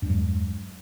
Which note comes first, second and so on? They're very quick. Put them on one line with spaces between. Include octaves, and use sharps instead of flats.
G2 E2 F#3 G#3